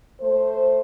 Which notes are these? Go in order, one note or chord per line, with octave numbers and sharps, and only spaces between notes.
A3 C5